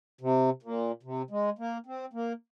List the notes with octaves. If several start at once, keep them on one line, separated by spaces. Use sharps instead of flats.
C3
A#2
C3
G#3
A#3
C4
A#3